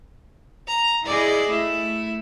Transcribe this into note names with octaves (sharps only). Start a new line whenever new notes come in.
A#5
E4 G#4 D5 D#5
A3 E4